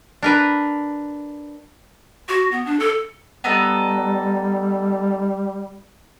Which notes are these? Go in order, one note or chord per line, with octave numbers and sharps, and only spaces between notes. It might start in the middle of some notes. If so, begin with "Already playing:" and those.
D4 A#4 B4
F#4
B3
D4
A4
G3 B3 D#4 A4